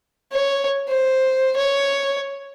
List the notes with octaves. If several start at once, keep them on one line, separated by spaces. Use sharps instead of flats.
C#5
C5
C#5